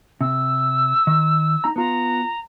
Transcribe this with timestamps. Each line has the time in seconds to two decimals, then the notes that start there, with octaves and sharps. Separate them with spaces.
0.21 C3 E6
1.07 D#3
1.64 D#4 A#5
1.76 B3 F4 A#5